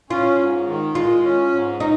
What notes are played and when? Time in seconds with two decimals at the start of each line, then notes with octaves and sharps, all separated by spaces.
0.10 C#4 F4
0.39 G#2
0.67 D#3
0.95 G#3 F4
1.24 C#4
1.52 G#2
1.80 D#4